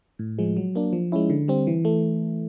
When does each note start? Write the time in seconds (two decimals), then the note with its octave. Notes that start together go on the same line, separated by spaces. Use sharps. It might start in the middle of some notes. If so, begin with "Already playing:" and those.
0.19 A2
0.39 F3 G#3
0.57 F#3
0.75 A#3 D4
0.93 F3
1.12 G#3 C#4 E4
1.30 D3
1.48 G3 C4
1.67 E3
1.85 A3